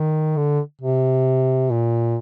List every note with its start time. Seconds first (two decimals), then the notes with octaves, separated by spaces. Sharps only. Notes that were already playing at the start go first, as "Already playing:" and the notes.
Already playing: D#3
0.37 D3
0.81 C3
1.70 A#2